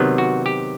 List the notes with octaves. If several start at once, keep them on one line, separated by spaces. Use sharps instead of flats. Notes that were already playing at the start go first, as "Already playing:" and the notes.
Already playing: C3 D#3 F#3 B3
F#4
G4